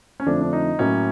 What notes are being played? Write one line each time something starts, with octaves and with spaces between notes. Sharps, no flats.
C#4
F2 D3 F3 A3 D4
D4
D#4
A2 F#3 A#3 C#4